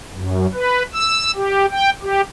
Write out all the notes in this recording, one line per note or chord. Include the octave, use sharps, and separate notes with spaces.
F#2
B4
E6
G4
G5
G4